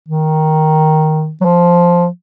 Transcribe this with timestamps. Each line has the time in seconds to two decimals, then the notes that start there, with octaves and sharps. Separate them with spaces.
0.08 D#3
1.41 F#3
1.45 F3